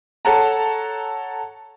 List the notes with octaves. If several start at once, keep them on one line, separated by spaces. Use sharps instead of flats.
A4 C#5 F#5 A5 A#5